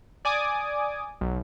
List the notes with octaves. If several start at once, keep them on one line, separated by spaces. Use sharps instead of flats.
D5 G#5 D6 D#6
B1